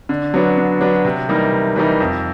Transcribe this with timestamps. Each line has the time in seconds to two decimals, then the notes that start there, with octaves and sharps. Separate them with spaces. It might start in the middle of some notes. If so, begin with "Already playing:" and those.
0.09 D3
0.34 F#3 B3 D4
0.58 D3
0.81 F#3 B3 D4
1.05 C3
1.29 E3 G3 A#3 D#4
1.52 C3
1.76 E3 G3 A#3 D#4
2.00 F2